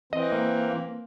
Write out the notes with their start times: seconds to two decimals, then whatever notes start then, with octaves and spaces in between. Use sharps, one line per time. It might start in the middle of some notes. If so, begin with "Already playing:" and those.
0.13 E3 C4 D#5
0.32 A#3